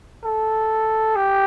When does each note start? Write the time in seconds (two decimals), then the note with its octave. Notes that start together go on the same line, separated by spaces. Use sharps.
0.24 A4
1.16 G4